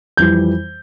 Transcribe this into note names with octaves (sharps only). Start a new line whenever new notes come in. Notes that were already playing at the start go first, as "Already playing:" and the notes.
F2 E3 G3 G6